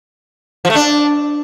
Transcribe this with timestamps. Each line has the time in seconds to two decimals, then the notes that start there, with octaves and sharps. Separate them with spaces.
0.65 F3
0.70 A3
0.75 D4